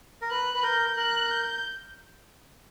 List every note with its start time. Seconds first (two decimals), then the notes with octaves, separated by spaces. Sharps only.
0.22 A#4
0.30 B4 F#6
0.55 B4
0.63 A#4 G6
0.97 A#4 F#6
1.31 G6